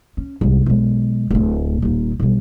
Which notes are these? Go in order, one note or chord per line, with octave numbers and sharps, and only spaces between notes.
C#4
C2 G#2
B1 G#3
D1 A3
D#1 D#4
B1 G3